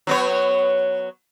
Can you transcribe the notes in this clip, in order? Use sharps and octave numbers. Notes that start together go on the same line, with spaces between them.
F#3 B3 C#5